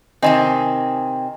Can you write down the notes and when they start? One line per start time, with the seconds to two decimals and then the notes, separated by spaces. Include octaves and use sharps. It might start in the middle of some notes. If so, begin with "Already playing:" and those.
0.22 C3 D#3 C4 D#5 G#5